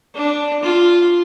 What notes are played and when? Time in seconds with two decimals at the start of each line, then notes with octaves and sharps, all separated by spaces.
0.14 D4
0.63 F4